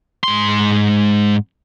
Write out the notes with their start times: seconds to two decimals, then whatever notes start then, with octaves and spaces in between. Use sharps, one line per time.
0.24 G#2 C6